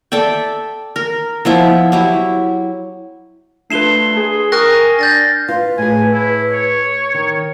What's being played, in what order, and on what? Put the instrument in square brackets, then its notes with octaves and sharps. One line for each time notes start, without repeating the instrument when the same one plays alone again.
[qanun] A4 D5 E5 G5
A#4
F3 B3 E4
F#3 E4 G4
[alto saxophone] A3 [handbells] D4 F4 B4 [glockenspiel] C7 E7 G7
[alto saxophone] G#4
[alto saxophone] A#4 [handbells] G5 C#6 D#6 [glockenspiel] F6 F#6 A#6
[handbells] G5 G#5
[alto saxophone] D4 [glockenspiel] G6 A6 A#6
[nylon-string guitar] F4 [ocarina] B4
[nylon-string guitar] A2 G#4 [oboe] G#5
[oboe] E4
C#5
[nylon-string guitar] D#3